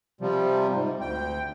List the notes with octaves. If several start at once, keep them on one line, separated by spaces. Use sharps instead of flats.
C3 F3 G3
G#2
D2 G5